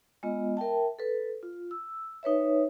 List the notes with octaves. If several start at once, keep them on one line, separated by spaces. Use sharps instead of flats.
G#3 B3 F4 D#5
A#4 E5 G5 A5
A4 B4
F4
E6
D#4 B4 C#5 E5